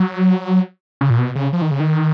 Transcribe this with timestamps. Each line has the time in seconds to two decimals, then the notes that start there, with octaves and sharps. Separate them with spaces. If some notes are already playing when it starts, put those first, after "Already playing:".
Already playing: F#3
1.01 C#3
1.10 A#2
1.18 B2
1.36 C#3
1.53 F3
1.62 D#3
1.71 C#3
1.80 D#3